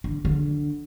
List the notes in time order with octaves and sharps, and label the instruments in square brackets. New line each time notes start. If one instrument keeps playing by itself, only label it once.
[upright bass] D3
D3